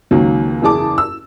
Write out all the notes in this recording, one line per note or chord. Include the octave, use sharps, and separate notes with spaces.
C#2 D#3 F#3 A#3
F#1 E2 G#4 A5 D6
E6